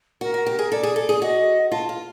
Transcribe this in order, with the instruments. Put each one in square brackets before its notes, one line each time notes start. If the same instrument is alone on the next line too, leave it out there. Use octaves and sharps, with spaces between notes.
[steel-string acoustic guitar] F#4 [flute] A#4
[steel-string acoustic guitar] F#4
G4
G#4
[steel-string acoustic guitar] A4 [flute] D5
[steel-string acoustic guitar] G#4
A4
G#4
[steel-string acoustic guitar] F#4 [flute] D#5
[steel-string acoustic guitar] F4 [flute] A5
[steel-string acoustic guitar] F4